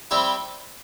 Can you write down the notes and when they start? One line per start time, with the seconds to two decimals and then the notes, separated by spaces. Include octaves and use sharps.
0.11 G3 C4 E4 G4